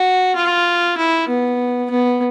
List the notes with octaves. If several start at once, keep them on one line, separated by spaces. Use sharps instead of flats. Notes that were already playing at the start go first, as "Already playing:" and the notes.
Already playing: F#4
F4
E4
B3
B3